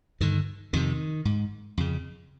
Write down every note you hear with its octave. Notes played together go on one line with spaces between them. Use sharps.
G2 D3 D#3
F2 C3 D#3
G#2
F2 C#3